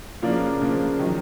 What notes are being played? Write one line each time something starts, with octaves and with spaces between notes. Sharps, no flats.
C#3 F3 A#3 D4
C#3 F3 A#3 D4
D#3 F#3